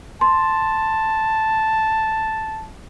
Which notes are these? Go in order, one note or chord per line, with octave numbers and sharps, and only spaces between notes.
A5 C6